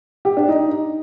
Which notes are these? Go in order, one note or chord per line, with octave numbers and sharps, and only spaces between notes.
G4
D4
D#4